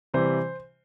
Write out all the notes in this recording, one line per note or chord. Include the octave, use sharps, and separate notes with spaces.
C3 E3 G3 C5